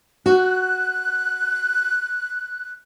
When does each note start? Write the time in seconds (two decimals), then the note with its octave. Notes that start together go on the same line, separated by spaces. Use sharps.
0.26 F#4 F#6